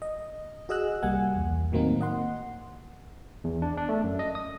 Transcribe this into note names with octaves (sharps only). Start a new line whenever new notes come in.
D#5
F#4 G#4 D#5 E6 F#6
C2 G3 A#3 F#5 G#5
E2
A2 D#3 F#3 A#3 C4 D#4
D#5 F#5 C6
E2
D4
D4
A3
F#2
D#5
D#6